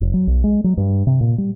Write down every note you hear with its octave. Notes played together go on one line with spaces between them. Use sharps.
F1
F#3
B1
G#3
F#3
G2
C3
A#2
G3